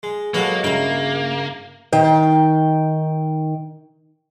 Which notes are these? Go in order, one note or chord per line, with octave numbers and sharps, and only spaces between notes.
G#3
F#3 G#3 A#3 B3 F#4 G4 A4
G2 C#3 A#3 E4 A#4 G5
D#3 G5